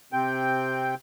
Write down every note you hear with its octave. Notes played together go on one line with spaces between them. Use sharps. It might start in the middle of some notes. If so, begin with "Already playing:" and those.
C3 C4 G5